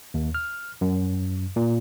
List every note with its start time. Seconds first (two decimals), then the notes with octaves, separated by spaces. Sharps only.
0.14 D#2
0.35 F6
0.81 F#2
1.56 A#2